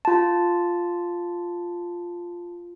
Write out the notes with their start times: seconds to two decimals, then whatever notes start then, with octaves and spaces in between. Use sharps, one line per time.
0.05 F4 A5